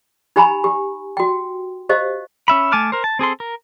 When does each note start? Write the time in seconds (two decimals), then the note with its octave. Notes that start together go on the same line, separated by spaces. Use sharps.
0.36 D#4 G4 G#5 A#5 B5
0.64 G4
1.17 F#4 G5
1.89 G4 C5 D#5 F5
2.48 C#4 E5 B5
2.72 A3 G#5 A5 D6 F6
2.92 A#4 C5
3.04 A5
3.19 C4 G#4 A4 C6
3.40 A#4